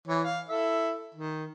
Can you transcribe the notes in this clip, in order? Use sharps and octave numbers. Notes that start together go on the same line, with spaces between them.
E3 C#5
F5
E4 A4 E5
D#3